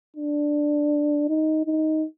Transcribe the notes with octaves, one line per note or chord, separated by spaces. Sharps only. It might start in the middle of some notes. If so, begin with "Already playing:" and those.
D4
D#4
D#4